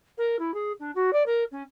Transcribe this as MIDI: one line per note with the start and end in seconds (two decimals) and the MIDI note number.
0.18 0.36 70
0.39 0.54 64
0.54 0.72 68
0.80 0.91 62
0.95 1.10 66
1.13 1.23 74
1.26 1.44 70
1.52 1.63 61